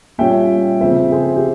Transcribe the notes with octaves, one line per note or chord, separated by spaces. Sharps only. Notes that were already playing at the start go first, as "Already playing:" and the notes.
A#2 G3 C#4 F4 E5 G5
C#3 F3 C4 C5 E5
G#4 C5
G4